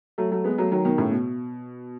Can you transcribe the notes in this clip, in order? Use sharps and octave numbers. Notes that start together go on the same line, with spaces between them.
F#3 A3
F#3 A3
G#3 B3
F#3 A3
D#3 F#3
B2 D#3
A2 C#3
B2